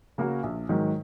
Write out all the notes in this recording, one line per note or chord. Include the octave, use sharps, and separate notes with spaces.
C#3 A#3 F#4 A#4
A#1
G#2 D#3 F#3